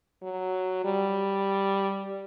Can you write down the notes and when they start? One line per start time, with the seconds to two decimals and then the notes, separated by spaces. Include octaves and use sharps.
0.23 F#3
0.84 G3